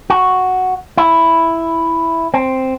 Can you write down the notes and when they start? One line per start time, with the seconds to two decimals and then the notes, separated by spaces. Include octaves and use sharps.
0.10 F#4
0.97 E4
2.34 C4